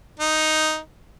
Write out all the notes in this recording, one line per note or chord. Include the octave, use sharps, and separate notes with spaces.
D#4